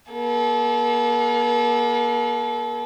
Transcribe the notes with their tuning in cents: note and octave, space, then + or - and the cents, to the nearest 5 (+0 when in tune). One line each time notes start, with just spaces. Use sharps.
A#3 +40 A4 -30